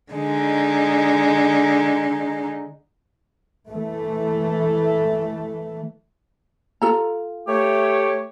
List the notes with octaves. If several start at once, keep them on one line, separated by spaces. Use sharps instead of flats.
D3 G#3 D#4
E3 A3
F4 A4 A#5
A3 G4 C#5